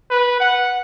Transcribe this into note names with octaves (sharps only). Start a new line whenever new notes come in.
B4
F#5